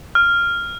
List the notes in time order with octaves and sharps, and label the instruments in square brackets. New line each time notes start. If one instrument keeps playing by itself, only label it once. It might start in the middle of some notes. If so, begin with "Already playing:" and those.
[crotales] F6